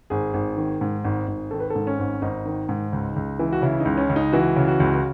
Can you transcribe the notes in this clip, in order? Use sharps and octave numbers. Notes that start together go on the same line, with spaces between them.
G#1 G#4
G#1
D#3
G#2
G#1
G#1
D#3 A4
B4
G#2 A4
C#4
G#1
G#1 D#4
D#3
G#2
C#2
C#2
E3
F#4
C#3 E4
D#4
C#2
C#4
C#2
D#4
E3 F#4
C#3
F#4
C#2